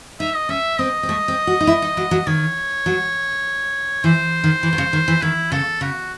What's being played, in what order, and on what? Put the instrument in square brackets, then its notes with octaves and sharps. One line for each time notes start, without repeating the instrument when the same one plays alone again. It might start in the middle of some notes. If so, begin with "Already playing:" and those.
[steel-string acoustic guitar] D#4 [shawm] E5
[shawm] D#5
[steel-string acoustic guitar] C#4 [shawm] E5
[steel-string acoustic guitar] C4 [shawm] D#5
[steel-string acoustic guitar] C4
A3
C4
F#4
D#4
E4
D#4
F#3
F#3
[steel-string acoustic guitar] D#3 [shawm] C#5
[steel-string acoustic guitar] F#3
[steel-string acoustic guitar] E3 [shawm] C5
[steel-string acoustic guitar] D#3
E3
D#3
C#3
D#3
E3
[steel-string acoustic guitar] D#3 [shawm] E4
[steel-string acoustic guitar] C#3 [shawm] A4
[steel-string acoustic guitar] C#3 [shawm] F#4